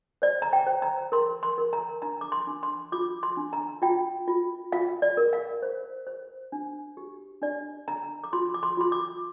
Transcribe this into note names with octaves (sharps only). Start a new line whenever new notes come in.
C5 D5
A#5
G5
C5
A#5
A#4 C6
C6
A#4
A#5
D4 A#5
D6
C6
D4
C6
F4 D6
C6
D4
A#5
F4 G5
F4
F4 F5
D5
A#4
F5
C5
C5
D4
G4
D4 D5
D4 A#5
D6
F4 C6
D6
C6
F4 C6
D6